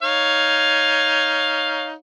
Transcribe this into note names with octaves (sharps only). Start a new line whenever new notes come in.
D#4 C#5 F5